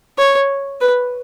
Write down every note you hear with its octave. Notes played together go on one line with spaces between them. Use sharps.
C#5
B4